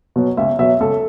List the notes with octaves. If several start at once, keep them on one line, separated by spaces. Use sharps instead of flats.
B2 F#3
C#2 E5
B2 F#3 E5
C#2 A4